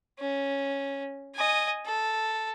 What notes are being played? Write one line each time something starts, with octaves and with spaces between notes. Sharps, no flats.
C#4
D#5 G#5
A4